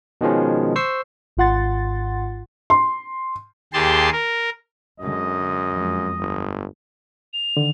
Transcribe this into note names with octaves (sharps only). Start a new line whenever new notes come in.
B2 D#3 F3 G#3 C#4
C5 C#6 E6 C7
G#1 G#2 F4 F#5 C6 A6
C6
D#2 G4 G#4 A5 C6
A#4
F#2 D3 G#3 D#5
F2 F3 G#3
G1
F7
D3 D#3